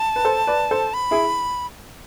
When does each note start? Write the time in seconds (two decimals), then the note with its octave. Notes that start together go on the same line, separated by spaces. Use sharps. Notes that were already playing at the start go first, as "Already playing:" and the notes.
Already playing: A5
0.16 B4
0.25 A4 C5
0.47 B4 D5
0.71 A4 C5
0.94 B5
1.11 E4 G#4